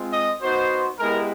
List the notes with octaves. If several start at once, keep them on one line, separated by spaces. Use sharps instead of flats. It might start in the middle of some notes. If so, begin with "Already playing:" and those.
Already playing: G#3 C4 F4
D#5
B3 D#4 F#4 C5
G#3 B3 E4 G4 A#4